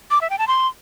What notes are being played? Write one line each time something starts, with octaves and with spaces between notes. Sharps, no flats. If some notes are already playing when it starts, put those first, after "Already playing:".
D6
E5
G5
A5
C6